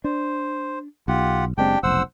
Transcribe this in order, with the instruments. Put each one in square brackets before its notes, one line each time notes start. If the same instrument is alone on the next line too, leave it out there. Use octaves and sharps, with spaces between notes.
[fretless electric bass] D4 [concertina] C5
[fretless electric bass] B1 [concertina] F4 G4 F#5
[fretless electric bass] F#1 G#3 C4 [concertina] D4 G4 G5
[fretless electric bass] F1 B1 [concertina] C5 F#5 E6